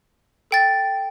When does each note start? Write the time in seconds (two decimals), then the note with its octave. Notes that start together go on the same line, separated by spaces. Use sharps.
0.51 A4 G5 A6